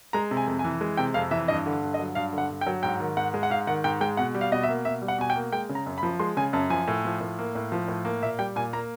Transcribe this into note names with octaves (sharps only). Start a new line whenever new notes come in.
G#3 A#5
C3
G#5
F2
G#5
E3
G#3
C3 G5
F2 F5
E3 E5
G2 D#5
D3
G2
D#5
F#3
G2 F5
D3
F#5
G2
G5
F#3
G#2 G5
D#3
G#2 F#5
G#3
F#5
G#2 F5
D#3 F#5
G#2 G5
G#3 G5
B2 F#5
G3
F5
B2 D#5
E5
A#3
B2 E5
G3
F#5
B2 G#5
G5
A#3
G#3 G5
C#3
A#5
F#2
B5
F3
G#3 C6
C#3 G#5
F#2 A5
F3 G#5
A2
F3
A2
A#3
A2
F3
A2
A#3
A#2 E5
G3 G5
A#2 G#5
A#3 A#5